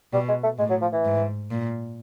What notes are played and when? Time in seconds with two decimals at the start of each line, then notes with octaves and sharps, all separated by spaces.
0.13 B2 G3
0.29 G#3
0.43 A3
0.58 A2 G#3
0.70 F#3
0.81 F3
0.92 E3
1.05 G#2
1.50 A#2